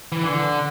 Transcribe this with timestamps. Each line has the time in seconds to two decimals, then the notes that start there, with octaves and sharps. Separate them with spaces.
0.12 E3
0.24 D3